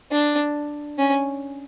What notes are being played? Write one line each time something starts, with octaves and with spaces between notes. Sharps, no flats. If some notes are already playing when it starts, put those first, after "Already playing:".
D4
C#4